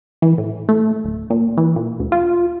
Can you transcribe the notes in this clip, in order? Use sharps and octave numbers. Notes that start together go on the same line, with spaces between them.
E3
A2
A3
D1
A#2
E3
A#2
D2
F4